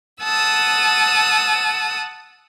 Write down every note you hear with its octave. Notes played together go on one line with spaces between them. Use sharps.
F#5 A5 D#6 E6